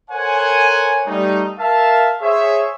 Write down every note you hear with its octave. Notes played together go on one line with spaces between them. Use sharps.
A4 A#4 C5 C#5 F#5 G#5
G3 A3 D#4
A#4 E5 F5 A5
G#4 C5 C#5 E5